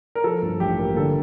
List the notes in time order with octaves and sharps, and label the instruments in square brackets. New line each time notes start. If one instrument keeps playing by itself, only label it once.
[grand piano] A#4
F3 A4
G2
A1 G4
A#3
D3 A4